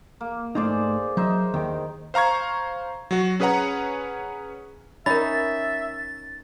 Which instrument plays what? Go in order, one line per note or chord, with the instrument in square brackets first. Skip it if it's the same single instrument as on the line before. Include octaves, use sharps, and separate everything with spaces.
[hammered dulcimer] A#3
[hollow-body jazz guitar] G#2 A3 D#4 [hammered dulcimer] G#4 C5 D5
[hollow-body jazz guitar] F#3 [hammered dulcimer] D#4 C5 E5
[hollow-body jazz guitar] D#2 G5 [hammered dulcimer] D#3
[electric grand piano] C5 F5 A#5 C#6 G#6
F#3 F#4
C#4 G#4 B4 C#5 F#5 A#5
[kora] C#4 D#4 [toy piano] A#4 B5 [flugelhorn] E5 [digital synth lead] A6